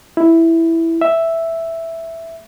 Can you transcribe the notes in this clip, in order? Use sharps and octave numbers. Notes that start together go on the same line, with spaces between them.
E4
E5